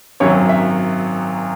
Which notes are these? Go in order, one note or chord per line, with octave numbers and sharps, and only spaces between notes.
G#1 F#2 F#3 C#5
E5